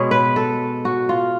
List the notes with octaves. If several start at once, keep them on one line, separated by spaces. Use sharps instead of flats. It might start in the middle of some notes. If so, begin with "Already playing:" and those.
Already playing: B2 G#3 B3 C#5
B4
A4
F#4
F4